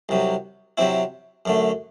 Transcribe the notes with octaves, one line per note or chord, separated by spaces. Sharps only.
C2 C3 F#3
C3 F#3 C4 E4
F#2 D3 A3